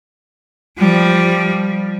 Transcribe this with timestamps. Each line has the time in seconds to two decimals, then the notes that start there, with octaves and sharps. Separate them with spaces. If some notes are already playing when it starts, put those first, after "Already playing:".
0.78 F3 G3